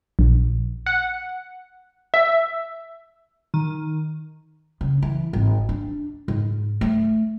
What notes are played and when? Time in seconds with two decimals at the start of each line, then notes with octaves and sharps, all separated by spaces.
0.19 A#1
0.86 F#5
2.14 E5
3.54 D#3
4.81 C#3
5.02 E3
5.33 G#1
5.69 D4
6.28 G#2
6.81 A3